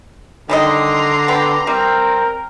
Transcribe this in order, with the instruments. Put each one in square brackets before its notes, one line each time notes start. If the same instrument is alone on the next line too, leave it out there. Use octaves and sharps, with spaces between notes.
[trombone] D3 [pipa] D#3 G3 D#5 [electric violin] A#5 C6
[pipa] B3 G4
[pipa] G3 [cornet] C4 [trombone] A#4